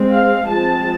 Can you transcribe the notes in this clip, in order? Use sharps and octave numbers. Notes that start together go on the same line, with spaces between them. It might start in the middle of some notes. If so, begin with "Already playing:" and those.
Already playing: G#3 C4
F5
F3 G#3 C4 A5